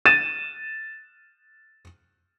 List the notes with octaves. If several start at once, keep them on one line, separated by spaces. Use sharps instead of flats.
A6 D#7 E7